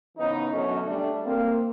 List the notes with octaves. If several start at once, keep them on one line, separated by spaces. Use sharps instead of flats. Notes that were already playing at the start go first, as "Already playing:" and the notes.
G#2 C#3 E3 B3 D#4
F#2 B2 D3 F#3 A3 C#4
G3 A3 D4
A#3 C4